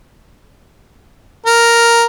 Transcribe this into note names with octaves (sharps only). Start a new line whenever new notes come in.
A#4